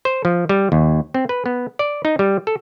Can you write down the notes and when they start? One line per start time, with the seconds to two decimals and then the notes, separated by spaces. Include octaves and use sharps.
0.05 C5
0.25 F3
0.49 G3
0.72 D#2
1.14 C4
1.29 B4
1.46 B3
1.79 D5
2.05 D#4
2.19 G3
2.47 A4